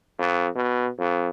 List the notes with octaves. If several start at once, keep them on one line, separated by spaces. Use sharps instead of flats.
F2
B2
F2